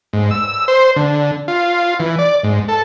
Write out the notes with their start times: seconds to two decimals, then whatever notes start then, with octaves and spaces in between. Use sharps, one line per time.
0.13 G#2
0.31 E6
0.68 C5
0.96 D3
1.48 F4
2.00 E3
2.19 D5
2.43 G#2
2.68 A4